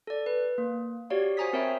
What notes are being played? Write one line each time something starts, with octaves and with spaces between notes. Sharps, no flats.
A4 D5
B4
A#3
F#4 G4 C#5 D5 F5
F#4 C5 G#5 A#5 D#6 B6
C4 A#4 C#5 E5 G5 B5